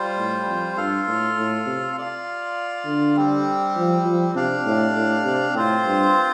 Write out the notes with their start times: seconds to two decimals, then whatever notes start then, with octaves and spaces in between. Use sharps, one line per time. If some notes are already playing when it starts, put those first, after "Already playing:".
Already playing: G3 F4 C5
0.17 A2
0.47 F2
0.77 G2 F4 A4 F5
1.08 A2
1.37 A2
1.66 C3
1.97 F4 D5 F5
2.85 D3
3.15 G3 C4 G4
3.76 F3
4.05 F3
4.35 C3 D4 G4 D5 F5
4.66 A2
4.95 A2
5.25 C3
5.54 A2 C4 F4 C5
5.85 G2